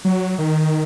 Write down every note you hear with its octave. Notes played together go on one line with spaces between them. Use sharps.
F#3
D#3